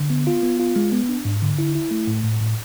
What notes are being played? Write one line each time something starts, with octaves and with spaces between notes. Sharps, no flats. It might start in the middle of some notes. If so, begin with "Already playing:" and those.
Already playing: D3
B3
F4
B3
F4
G#3
B3
D4
G#2
D3
E4
E4
A3
A2
A2
A2